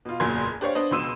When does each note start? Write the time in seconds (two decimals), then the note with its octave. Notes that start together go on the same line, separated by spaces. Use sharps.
0.05 B2 F4
0.20 F#1 E2 A#2 F#3 C6 G#6
0.61 D4 G4 C5 C#5 F5 C#6
0.75 B3 D4 C5 D#5
0.91 C#2 B2 C6 E6 D#7 E7